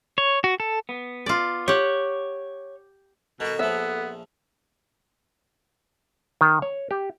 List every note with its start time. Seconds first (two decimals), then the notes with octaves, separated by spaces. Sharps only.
0.18 C#5
0.44 F#4
0.60 A4
0.89 B3
1.26 F4 D5
1.68 G4 C#5 F#5
3.40 B2 D#3 F#4 A4
3.59 A#1 F3 B3 E5
6.41 D#3
6.62 C#5
6.91 G4